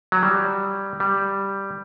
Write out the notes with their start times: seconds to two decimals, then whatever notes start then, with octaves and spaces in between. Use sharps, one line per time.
0.12 F#3
0.23 G3
1.00 G3